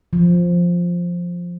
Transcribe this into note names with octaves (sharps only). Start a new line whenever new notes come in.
F3